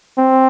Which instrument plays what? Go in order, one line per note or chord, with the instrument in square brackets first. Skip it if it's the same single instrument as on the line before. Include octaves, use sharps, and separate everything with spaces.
[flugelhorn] C4